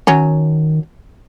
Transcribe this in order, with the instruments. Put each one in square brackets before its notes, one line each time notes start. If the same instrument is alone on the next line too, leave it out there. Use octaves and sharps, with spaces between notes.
[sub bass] D#3 [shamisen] F#3 C#4